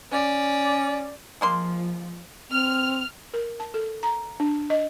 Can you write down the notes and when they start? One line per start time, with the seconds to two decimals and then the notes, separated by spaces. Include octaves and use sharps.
0.12 C#4 D5
1.41 F3 G#3 A#3 C6
2.50 C4 F6
3.34 A#4
3.60 A5
3.74 A4
4.03 A#5
4.40 D4
4.70 D#5